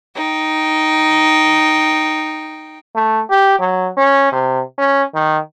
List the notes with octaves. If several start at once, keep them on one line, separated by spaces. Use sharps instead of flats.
D#4 G5
A3
G4
F#3
C#4
C3
C#4
D#3